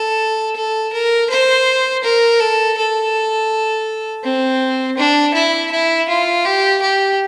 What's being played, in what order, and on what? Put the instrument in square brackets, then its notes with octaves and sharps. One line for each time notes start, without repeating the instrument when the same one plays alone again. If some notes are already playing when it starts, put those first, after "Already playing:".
Already playing: [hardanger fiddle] A4
A4
A#4
C5
A#4
A4
A4
C4
D4
E4
E4
F4
G4
G4